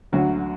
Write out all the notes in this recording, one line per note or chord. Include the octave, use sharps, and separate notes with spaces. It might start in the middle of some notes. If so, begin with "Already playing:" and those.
D2 D3 F#3 F#4